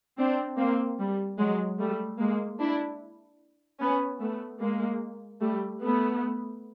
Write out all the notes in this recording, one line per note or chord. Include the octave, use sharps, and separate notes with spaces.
C4 D4
A#3 C4
G3
F#3 G#3
G3 A3
G#3 A#3
D4 E4
B3 C#4
A3 B3
G#3 A#3
G3 A3
A3 B3